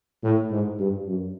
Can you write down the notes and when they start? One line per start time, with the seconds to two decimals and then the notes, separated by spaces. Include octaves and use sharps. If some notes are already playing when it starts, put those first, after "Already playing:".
0.23 A2
0.51 G#2
0.80 G2
1.08 F#2